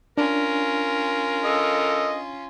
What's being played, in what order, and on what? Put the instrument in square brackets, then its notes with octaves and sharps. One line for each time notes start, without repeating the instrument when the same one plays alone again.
[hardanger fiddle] C#4 F4 [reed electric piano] D4 [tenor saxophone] A#4
[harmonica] A4 D#5